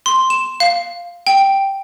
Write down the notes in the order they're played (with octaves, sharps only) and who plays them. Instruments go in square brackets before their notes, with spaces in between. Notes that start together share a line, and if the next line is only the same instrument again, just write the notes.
[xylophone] C6
E7
F5
G5